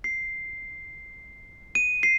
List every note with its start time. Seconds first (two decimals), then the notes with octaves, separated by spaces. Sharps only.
0.04 C7
1.75 D#7
2.03 C7